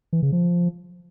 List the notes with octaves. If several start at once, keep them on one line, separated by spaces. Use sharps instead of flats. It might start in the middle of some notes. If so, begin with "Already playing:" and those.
E3
C#3
F3